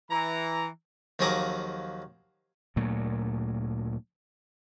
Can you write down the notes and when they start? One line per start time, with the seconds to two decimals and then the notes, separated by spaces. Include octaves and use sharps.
0.11 E3 A#5
1.19 D#2 F3 F#3 G#4 A#5 D6
2.76 D2 A#2 F#3 A3